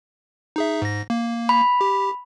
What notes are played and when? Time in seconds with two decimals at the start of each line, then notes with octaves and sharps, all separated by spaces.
0.56 D#4 G#4 E5
0.82 G#2 A#6
1.10 A#3
1.49 B5
1.81 G4